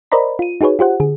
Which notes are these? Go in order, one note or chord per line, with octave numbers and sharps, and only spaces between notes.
A#4 C5 D5 D#5 A#5 B5
F4 D#7
D#4 F#4 G#4 B4 C#5
F4 G4 C5 F#5
D3 G#4